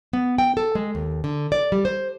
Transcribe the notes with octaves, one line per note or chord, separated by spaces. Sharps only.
B3
G5
A4
G#3
D#2
D3
D5
G3
C5